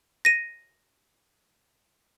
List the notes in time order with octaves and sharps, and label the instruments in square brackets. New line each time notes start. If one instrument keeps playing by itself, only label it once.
[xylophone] A#6 D#7